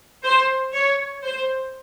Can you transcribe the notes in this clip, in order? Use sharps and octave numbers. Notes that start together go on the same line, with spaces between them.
C5
C#5
C5